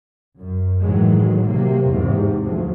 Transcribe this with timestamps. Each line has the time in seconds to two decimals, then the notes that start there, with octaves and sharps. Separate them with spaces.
0.38 F#2
0.81 A2 D#3 E3 F#3 G#3
1.46 C3 F#3 A#3
1.90 E2 G#2 C3
2.44 D2 F3 F#3